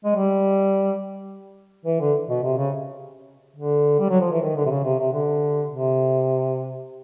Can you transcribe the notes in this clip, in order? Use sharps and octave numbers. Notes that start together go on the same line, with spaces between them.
G#3
G3
E3
D3
B2
C3
C#3
D3
G3
F#3
F3
E3
D#3
D3
C3
C#3
C3
C3
D3
C3